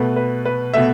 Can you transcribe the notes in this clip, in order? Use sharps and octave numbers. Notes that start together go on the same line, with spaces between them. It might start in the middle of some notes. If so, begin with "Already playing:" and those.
Already playing: B2 A3 B4
B4
B4
B2 A3 E5